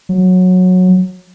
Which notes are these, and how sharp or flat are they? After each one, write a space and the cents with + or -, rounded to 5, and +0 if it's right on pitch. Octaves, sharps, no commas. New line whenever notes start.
F#3 -15